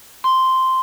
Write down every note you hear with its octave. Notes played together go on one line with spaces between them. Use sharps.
C6